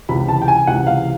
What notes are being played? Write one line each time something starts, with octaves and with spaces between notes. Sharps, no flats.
C#2 C3 E3 B5
A5
G5
G#5
C#2 C3 E3 F#5
F5